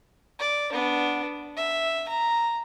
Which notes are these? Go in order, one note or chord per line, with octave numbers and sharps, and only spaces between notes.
D5
B3 D4
E5
A#5